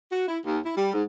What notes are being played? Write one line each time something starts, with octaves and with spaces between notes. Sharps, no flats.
F#4
E4
D#2
E4
G3
G#2